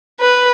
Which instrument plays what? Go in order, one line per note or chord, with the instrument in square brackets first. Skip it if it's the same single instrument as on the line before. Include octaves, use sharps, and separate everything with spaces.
[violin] B4